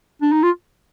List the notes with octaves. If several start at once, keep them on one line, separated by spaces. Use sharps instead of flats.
D4
D#4
F4